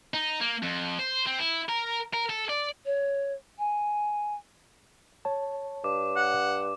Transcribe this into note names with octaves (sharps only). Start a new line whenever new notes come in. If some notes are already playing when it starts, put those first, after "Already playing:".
D#4
A#3
F2
C5
C4
E4
A#4
A#4
A4
D5
C#5
G#5
C#5 A5
G2 D6
F#5